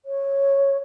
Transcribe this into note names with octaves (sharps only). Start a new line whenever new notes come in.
C#5